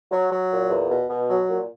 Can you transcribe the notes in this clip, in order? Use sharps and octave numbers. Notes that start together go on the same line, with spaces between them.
F#3
F#3
A#2
E2
B2
B2
F#3
A#2